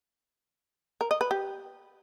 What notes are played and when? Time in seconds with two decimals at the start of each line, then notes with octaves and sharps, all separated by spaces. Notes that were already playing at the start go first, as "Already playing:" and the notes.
1.01 A#4
1.11 D#5
1.21 B4
1.31 G4